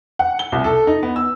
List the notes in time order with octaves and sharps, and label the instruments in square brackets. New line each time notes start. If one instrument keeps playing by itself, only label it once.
[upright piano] F#5
G7
C2
A4
D#4
B3
E6